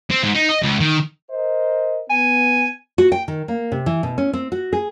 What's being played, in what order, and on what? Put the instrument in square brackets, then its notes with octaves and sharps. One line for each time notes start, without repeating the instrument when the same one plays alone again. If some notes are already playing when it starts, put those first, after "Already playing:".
[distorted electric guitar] C4
G#2
D#4
D#5
C#2
D#3
[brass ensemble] A#4 C5 D#5
[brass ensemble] B3 [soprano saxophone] G#5
[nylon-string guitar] F#4
G5
D#3
A#3
C3
E3
B2
C#4
C4
F#4
G#4